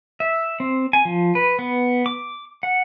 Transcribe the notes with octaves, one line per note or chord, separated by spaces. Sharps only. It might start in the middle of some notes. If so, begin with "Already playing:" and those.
E5
C4
G#5
F3
B4
B3
D6
F#5